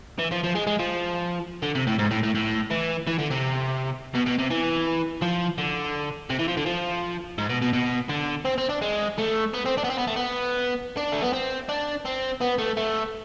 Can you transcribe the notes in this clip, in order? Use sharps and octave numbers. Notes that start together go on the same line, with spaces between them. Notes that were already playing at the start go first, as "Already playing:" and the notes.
E3
F3
F3
G#3
G#3
F3
D3
C3
A2
G#2
A2
A2
A2
E3
E3
D3
C3
B2
B2
C3
E3
F3
D3
C3
E3
F3
D3
F3
G#2
B2
B2
B2
D3
C4
C4
D4
G#3
A3
B3
C4
D4
B3
C4
B3
A3
B3
D4
A3
B3
C4
D4
C4
B3
A3
A3